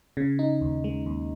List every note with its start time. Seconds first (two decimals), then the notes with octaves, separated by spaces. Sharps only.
0.17 C#3
0.39 D#4
0.61 D#2
0.84 G#3
1.06 D#2